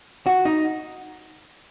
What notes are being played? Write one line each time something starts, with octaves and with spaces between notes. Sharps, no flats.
F#4
D#4